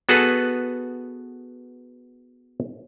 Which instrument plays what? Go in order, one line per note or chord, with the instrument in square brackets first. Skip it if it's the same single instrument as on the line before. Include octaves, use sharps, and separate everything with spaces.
[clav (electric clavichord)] B3 F#4 G#4 A4 B4